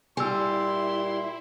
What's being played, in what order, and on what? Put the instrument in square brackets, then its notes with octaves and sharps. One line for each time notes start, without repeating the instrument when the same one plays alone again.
[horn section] A#2 C6 [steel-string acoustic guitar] G3 [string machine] E4 [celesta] G#5 E6